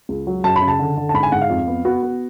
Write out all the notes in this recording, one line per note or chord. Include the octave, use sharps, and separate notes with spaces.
C#2
F#3
F#2 A5
B5
C#3
A5
D3
D3
A5
G#2 B5
G#5
G#2 F#5
F5
F2
B3
B3 F#4
B3